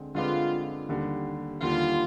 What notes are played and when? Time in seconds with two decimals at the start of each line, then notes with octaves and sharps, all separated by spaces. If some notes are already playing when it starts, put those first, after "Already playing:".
Already playing: D3 G#3 C4
0.15 D3 G#3 C4 F4 G4 B4
0.89 D#2 D3 G3
1.61 D#2 D3 G3 F4